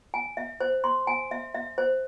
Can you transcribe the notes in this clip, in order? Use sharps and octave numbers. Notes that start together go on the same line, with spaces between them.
G#5
E5
C5
C6
G#5
E5
E5
C5